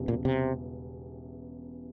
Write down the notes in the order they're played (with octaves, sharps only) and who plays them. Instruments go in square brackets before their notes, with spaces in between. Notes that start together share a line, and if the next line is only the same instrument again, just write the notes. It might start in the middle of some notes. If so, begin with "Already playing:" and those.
Already playing: [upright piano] E1 E2 C#3 E3 G3
[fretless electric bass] A#2
C3